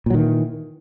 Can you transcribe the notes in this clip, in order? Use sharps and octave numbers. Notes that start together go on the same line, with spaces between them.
A#2 D#3 E3 F#3